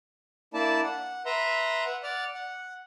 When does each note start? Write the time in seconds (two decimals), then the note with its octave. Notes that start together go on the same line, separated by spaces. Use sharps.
0.54 A#3 D4 E4 D5 A5
0.83 F#5
1.26 B4 E5 A#5 C6
1.86 F#5
2.03 D5 F#5 F6
2.35 F#5